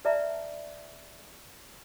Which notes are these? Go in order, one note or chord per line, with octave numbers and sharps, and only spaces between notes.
B4 D5 E5 A5 A#5